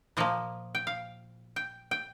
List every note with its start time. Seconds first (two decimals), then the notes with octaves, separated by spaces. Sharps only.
0.17 A#2 F3 A#3 D#5
0.75 G5
0.87 F5
1.56 G5
1.91 G5